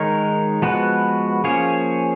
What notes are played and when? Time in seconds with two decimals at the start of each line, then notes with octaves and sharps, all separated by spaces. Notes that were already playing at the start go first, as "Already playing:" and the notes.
Already playing: D#3 G#3 D#4 A#4 C#5
0.62 F3 G#3 B3 F#4 B4
1.44 F3 A#3 C#4 G#4 C#5